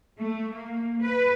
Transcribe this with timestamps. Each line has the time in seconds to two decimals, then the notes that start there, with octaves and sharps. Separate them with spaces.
0.19 A3
0.53 A#3
1.02 B4